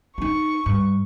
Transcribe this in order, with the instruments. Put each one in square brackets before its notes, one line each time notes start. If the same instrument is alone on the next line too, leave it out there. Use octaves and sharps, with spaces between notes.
[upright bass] D#4 F4 [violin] C#6
[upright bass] G2